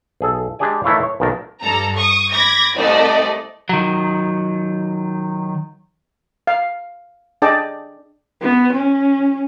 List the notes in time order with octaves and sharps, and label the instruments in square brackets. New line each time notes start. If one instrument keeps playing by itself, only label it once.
[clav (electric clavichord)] B1 G#4 A4
G#3 D4 G4 G#4 D5 G#5
D#3 E3 A3 E4 C#5 F5
C#5
B1 A#2 D#3 A#4 A5
[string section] G2 A4 A#5
C#6 D#6
B5 D6 G#6 A#6
C2 A3 D5 D#5
[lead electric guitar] D#3 F#3
[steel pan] F5
D4 G#4 D5 D#5 G5 A5
[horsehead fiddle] B3
C#4